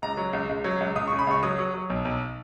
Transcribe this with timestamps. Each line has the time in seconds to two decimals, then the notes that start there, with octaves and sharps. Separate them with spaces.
0.02 C#2 A#5
0.17 F#3
0.33 C#2
0.49 C#2
0.64 F#3
0.80 C#2
0.95 C#2 D#6
1.07 C#3 C#6
1.19 B5
1.27 C#2 C#6
1.43 F#3 D#6
1.59 F#3
1.74 F#3
1.90 B1
2.05 B1